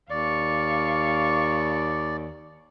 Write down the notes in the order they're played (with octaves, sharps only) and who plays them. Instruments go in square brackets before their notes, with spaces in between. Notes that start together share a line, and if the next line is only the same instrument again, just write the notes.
[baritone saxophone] D#2 [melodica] D5 [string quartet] F5 C#6